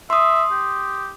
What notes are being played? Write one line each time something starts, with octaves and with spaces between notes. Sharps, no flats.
E5 C6 D#6
G4